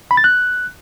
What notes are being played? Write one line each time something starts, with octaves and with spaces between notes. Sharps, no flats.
B5
A6
F#6